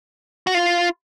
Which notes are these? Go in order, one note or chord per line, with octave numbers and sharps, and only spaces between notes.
F#4
F4